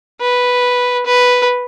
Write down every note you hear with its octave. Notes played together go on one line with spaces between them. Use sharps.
B4
B4